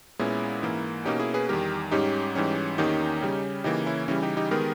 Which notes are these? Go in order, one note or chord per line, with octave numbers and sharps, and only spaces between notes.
A#2 G#3 B3 C#4 E4
G#2 E3 A#3
B2 A#3 C#4 D#4 G4
E4 G#4
G#4 B4
E2 D#3 G3 G4 A#4
G#2 G3 C#4 D#4 G4
G#2 E3 G3 C#4
E2 D#3 A#3 C#4 D#4 G4
C#3 G3 C#4
C#3 E3 A#3 D#4 G4
C#4 E4
C#3 E3 G3 C#4 E4
D#4 G4
D#4 G4
D#3 G#3 B3 G4 A#4